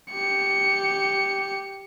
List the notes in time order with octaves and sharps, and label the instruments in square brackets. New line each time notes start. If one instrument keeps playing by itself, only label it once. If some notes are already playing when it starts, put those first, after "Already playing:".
[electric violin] G4 C#7